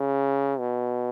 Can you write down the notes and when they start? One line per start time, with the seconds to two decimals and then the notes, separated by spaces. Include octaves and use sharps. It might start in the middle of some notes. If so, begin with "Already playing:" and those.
Already playing: C#3
0.59 B2